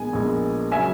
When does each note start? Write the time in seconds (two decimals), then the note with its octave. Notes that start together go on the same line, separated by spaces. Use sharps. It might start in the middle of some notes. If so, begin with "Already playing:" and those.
Already playing: A#1 A#2 G#3 B3 G#5
0.13 A#1 A#2 G#3 B3
0.72 C#3 F#3 E5 G#5